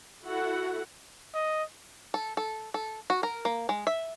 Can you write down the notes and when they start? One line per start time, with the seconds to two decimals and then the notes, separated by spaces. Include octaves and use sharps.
0.24 E4 F#4 A4 F#5
1.34 D#5
2.14 A4
2.37 A4
2.74 A4
3.10 F#4
3.23 A#4
3.45 A#3
3.69 G#3
3.87 E5